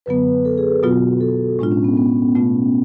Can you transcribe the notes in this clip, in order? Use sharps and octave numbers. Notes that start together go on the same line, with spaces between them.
F#2 D3 F#3 B3 B4
A4
G#4
B2 F#3 B3 F4 F#4
A4
A2 G#3 D4 F4
C#4
B3
B3
B2 A3 C#4 F4